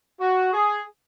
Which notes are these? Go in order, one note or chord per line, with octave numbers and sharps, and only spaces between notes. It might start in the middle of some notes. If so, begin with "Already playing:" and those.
F#4
G#4